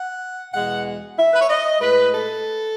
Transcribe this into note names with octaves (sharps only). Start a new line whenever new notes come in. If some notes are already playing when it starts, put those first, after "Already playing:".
Already playing: F#5
E2 B2 G#3 F#5
E5
B4
C#5
D#5
A2 G#3 B4
A4